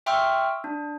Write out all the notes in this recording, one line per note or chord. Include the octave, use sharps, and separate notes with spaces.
E5 G5 C6 C#6 E6 F6
D4